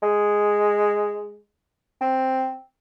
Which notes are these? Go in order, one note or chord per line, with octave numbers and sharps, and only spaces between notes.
G#3
C4